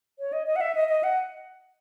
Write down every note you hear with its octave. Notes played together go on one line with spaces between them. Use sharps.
C#5
D#5
D#5
F#5
E5
D#5
D#5
F#5